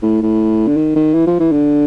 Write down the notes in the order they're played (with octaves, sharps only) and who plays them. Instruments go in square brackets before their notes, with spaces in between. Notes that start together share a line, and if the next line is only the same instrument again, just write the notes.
[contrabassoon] A2
A2
D3
D#3
D#3
E3
F3
E3
D3